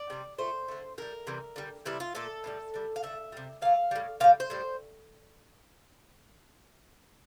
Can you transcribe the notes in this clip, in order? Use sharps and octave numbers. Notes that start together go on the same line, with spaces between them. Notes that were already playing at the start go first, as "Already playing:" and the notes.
Already playing: D5
C3 G3
A#2 A3 C5
D3 A3
A2 G3 A#4
C3 E3 G3
D3 G3
C3 E3 G3 E4
F4
A#2 A3 A4
A2 E3 G3
D3 G3
F5
D3 A3 E5
C3 G3
A#2 A3 F5
A2 G3
A#2 G3 F5
C5
A2 G3